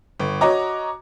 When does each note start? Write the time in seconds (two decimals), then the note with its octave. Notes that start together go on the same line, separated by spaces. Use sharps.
0.20 G1
0.41 F#4 C#5 D#5 A#5 D6